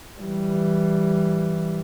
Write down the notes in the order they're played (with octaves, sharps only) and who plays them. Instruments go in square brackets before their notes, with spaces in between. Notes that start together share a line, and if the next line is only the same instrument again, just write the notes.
[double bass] E3 G3